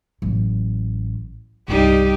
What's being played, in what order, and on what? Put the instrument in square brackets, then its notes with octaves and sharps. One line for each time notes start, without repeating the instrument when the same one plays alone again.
[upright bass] A1 F#3
[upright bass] C2 G2 [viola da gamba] G3 D#4 G4